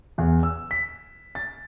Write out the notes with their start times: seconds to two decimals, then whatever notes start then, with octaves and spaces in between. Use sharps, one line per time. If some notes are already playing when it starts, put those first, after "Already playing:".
0.18 E2
0.43 E6
0.71 B6
1.35 A6